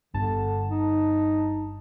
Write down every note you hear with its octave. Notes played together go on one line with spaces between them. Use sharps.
G1 G2 D3 A5
D#4